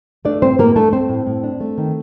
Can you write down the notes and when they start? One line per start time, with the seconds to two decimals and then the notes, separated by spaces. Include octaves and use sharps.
0.25 A3 D4 D5
0.42 A2 C4 C5
0.59 A2 A#3 A#4
0.76 A3 D4 A4
0.92 A3 C4 C5
1.09 A2
1.27 A2
1.44 D4
1.61 A3
1.78 D#3